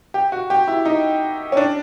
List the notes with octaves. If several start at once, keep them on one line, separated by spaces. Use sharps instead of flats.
G4
F#4
G4
E4
D#4
C#4
D4